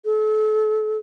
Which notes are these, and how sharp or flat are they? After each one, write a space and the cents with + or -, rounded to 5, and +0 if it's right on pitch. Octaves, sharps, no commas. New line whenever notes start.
A4 -35